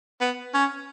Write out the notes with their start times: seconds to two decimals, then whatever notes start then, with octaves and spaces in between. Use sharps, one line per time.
0.21 B3
0.54 C#4